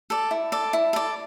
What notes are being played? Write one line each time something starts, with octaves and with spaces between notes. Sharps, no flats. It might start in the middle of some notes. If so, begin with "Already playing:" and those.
A4 D5
E4
A4 D5
E4
A4 D5